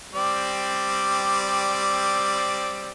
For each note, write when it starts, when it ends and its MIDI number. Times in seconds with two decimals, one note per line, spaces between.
0.14 2.91 55
0.14 2.91 60
0.14 2.91 74